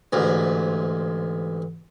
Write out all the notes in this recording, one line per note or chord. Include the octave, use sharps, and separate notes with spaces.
A1 D2 G#2